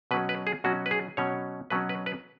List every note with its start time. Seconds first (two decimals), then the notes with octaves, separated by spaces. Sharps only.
0.11 B2 F#3 C#4 B4
0.29 B4
0.47 G#4
0.64 B2 F#3 C#4 F#4
0.86 B4
0.91 G#4
1.17 B2 F#3 C#4 C#5
1.70 B2 F#3 C#4 B4
1.89 B4
2.06 B4